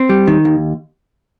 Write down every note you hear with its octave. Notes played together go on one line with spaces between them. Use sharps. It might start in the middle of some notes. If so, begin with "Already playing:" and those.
Already playing: C4
G3
D#3
D#2